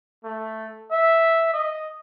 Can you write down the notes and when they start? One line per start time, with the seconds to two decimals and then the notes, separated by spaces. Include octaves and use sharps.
0.24 A3
0.91 E5
1.53 D#5